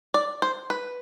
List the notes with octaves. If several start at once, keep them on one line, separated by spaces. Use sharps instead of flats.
D5
C5
B4